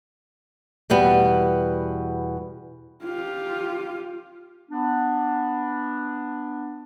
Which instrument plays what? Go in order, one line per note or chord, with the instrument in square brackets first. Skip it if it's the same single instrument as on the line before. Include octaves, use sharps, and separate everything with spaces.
[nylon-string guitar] E2 B2 G3 B3
[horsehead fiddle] F4 G4
[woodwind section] B3 D4